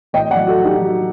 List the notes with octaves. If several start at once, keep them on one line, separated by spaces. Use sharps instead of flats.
A2 D#5 G5
D5 F#5
F#3
F#4 A4
F#3
D#4 G4
F#3